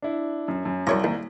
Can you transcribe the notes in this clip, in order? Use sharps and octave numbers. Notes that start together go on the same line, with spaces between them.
D4 E4
F#2
F#2
C2 F#2 C#5 A#5
D#2